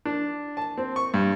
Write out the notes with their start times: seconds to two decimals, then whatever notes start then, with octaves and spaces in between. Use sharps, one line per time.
0.05 D4
0.57 A5
0.78 C4
0.96 C#6
1.14 G2